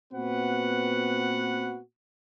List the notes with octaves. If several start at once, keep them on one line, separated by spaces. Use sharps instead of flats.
A#2 B3 C4 F#4 B4 F#5